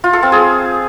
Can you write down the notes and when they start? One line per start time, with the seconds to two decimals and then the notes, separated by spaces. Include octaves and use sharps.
0.04 F4
0.13 A4
0.23 C4
0.32 G#4